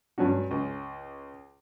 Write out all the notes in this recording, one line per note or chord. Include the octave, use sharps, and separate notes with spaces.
G2 F#3 C#4 D4 F#4
C#2